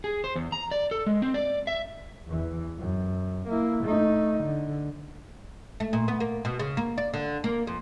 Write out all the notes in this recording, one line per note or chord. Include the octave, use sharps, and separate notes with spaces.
G#4
C5
E2
A#5
D5
A4
G#3
C4
D5
E5
E2 E3
F#2
A#3 E4
A3 D#4
D3
A3
A#2
B3
A#3
B2
C#3
A#3
D5
D3
A#3
F2